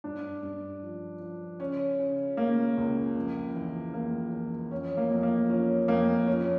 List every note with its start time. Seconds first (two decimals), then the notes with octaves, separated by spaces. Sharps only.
0.04 G2 D4
0.43 G2
0.83 F3
1.21 F3
1.60 C#3 C#4
1.99 C#3
2.37 C#3 A#3
2.77 C#2
3.16 F2
3.55 E3
3.94 F2 A#3
4.32 E3
4.71 F2 C#4
4.97 A#3
5.11 F2
5.23 A#3
5.49 F3 C#4
5.88 F2 A#3
6.27 F3 C#4